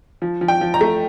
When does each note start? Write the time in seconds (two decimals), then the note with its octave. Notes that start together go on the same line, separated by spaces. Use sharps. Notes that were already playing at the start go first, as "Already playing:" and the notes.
0.22 F3
0.41 F3
0.48 G5
0.61 F3
0.74 A#5
0.81 A3